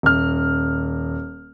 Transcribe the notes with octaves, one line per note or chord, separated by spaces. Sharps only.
D#1 F6